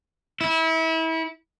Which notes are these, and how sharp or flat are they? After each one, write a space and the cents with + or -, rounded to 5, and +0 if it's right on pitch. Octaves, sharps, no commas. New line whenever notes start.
E4 -30